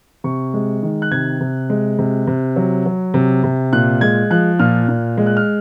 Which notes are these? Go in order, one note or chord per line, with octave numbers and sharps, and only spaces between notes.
C3 C#6
G#3
D#3
F#6
C3 G#6
C3
G#3
C3
C3
F#3
F#3
C3
C3
A#2 F#6
G#3 G#6
F3 F#6
A#2 F6
A#2
G#3
F#6
F6